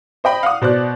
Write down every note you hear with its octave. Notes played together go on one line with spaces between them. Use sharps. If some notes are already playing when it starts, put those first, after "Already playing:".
C5 D#5 G5 B5
F5 F#5 D#6
B2 C5 D5 F#6